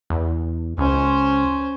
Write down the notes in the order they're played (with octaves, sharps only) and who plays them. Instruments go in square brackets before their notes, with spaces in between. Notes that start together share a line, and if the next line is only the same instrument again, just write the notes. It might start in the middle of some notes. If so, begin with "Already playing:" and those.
[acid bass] E2
[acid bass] C#2 [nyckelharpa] C#4 C5